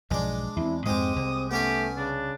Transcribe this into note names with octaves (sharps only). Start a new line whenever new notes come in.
B1 G#2 F3 G#3 D4
E2 C4 E4
F2 G#2 G#3 C4 G4 D#6
C2 C4
A3 B3 C#4 G4 G#5
C#3 D4